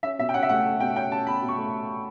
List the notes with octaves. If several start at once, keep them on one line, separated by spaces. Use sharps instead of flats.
C#4 E5
B2 E5
G5
C#4 F#5
E5
A3 F#5
A3
B2 G5
C#4 G5
C#4 A5
B2 B5
B2
C#6
A3